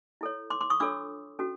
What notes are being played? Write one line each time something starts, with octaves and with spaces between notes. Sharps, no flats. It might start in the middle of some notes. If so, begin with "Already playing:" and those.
E4 A4 C#5
C6 D6
C6 D6
C#6 D#6
D4 F4 A4 C#5 D6 E6
C#4 F#4 A4